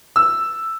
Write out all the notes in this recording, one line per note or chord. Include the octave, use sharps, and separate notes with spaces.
E6